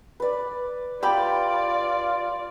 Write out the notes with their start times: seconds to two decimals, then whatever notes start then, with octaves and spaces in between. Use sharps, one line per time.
0.20 B4 D5
1.03 F4 G4 D5 B5 D6